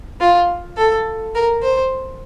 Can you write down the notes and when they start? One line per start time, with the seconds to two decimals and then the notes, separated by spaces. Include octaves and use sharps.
0.20 F4
0.77 A4
1.35 A#4
1.63 C5